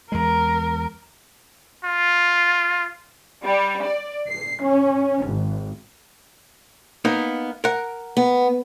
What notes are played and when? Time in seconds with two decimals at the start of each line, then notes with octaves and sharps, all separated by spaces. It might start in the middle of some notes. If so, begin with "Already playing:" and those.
0.12 E2 G#3 A#4
1.85 F4
3.44 G3
3.86 D5
4.27 C7
4.62 C#4
5.24 G#1
7.05 A#3 B3 D#4
7.64 A#4 F#5
8.17 B3